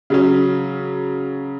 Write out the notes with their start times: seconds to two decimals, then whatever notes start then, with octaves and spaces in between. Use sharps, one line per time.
0.10 C#3 F#3 C#4